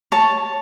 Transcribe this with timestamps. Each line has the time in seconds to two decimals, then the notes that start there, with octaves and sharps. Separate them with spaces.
0.12 C#5 A5